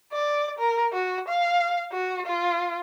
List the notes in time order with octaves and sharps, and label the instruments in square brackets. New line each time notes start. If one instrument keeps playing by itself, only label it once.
[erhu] D5
A#4
F#4
F5
F#4
F4